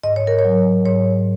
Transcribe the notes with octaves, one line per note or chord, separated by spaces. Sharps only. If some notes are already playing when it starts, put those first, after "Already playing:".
G#2 D#5
C#5
A#4
C#5
F#3
G#2 C#5